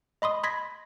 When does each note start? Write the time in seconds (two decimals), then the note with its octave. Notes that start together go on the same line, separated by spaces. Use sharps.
0.22 D#5 B5 C6 D#6
0.44 B5 C6 G#6 A#6 B6